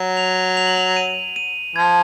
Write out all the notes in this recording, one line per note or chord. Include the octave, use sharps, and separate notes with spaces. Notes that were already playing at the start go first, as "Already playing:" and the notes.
Already playing: F#3
F7
F7
F#7
F7
D#7
D#7
F3 G#6